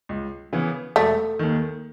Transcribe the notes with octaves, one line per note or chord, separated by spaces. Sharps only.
C#2
C#3 E3 B3
E1 A3
D#2 D#3